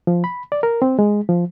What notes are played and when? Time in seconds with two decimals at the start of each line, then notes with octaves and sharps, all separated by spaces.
0.07 F3
0.24 B5
0.52 D5
0.63 A#4
0.82 C4
0.99 G#3
1.29 F3